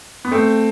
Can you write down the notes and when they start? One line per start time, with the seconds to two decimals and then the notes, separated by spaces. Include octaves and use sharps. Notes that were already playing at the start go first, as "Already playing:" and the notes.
0.25 B3
0.31 A3 C4